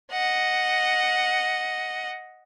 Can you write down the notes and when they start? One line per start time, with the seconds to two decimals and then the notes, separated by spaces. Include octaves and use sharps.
0.12 D#5 F#5